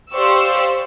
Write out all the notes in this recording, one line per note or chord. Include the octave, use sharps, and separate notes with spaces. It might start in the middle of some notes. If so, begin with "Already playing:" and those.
G4 C5 D5 F5 C#6 E6